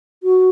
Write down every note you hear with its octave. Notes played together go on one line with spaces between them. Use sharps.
F#4